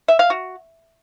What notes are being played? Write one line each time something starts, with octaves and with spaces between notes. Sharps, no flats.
E5
F5
F#4